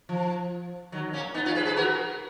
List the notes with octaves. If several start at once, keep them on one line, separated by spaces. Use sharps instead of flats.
F3
D#3 F#3
A#3 C#4
B3 D#4
C#4 F4
G#4 B4
G#4 B4
F#4 A#4